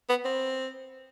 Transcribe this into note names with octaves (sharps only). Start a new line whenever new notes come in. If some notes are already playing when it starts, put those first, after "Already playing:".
B3
C4